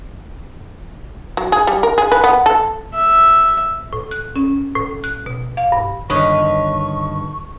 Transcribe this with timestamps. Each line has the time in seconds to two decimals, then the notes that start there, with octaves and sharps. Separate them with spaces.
1.37 F#3
1.52 G#4
1.67 G3
1.83 A#4
1.98 G#4
2.12 B4
2.24 B3
2.46 A4
2.94 E5
3.93 A2
4.11 F#6
4.36 C#4
4.75 A2
5.04 F#6
5.26 B2
5.57 F5
5.72 G2
6.10 G2 D3 D#3 B4 C#5 D#5 C#6